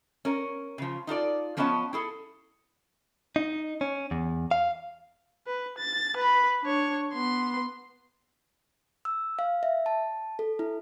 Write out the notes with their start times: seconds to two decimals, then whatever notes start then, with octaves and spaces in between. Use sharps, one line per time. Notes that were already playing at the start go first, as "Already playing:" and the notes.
0.25 C#4 A#4
0.78 C#3 F3
1.07 D#4 F4 A4 D5
1.57 F3 B3 C#4 C#5 D#5 A5
1.93 E4 G#4 A4
3.36 D#4
3.81 C#4
4.11 E2
4.51 F5
5.47 B4
5.78 A6
6.17 B4 B5
6.63 D4 C#5
7.13 B3 C6
9.05 E6
9.39 F5
9.63 E5
9.86 A5
10.39 A4
10.59 E4